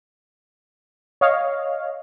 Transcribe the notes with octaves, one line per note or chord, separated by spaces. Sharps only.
C#5 D#5 F5